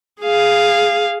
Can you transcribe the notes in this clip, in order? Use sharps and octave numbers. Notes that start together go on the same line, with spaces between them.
G#4 F5